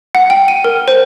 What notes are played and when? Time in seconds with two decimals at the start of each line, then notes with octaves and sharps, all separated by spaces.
0.15 F#5
0.30 G5
0.48 D#7
0.64 A#4
0.88 C5